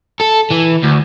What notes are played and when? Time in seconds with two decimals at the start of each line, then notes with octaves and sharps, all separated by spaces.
0.20 A4
0.50 E3
0.83 D2